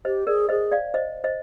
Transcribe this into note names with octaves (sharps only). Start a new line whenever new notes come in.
G4 C5 D#5
G#4 A#4 D5
G#4 C5 D#5
D5 F5
C5 D#5
C5 D#5